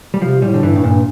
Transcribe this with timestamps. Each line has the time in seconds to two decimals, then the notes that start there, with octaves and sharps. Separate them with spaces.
0.14 G3
0.21 C3 F3
0.42 A2 G3
0.54 D3
0.63 G2 E3
0.76 A2
0.84 G2 A#2